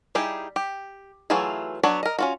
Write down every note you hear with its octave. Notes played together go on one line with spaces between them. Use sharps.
G3 D#4 E4 G4 G#4
G4
E3 F#3 A3 F4 G#4
F#3 B3 D4 C#5 F#5
A#4 D#5
C#4 F4 F#4